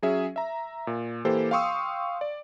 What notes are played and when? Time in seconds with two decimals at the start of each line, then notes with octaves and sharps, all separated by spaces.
0.02 F#3 C#4 G#4 E5
0.36 E5 A#5
0.87 A#2
1.25 E3 A#3 G4 A4 C5
1.51 F5 G5 C6 C#6 D#6 E6
2.21 D5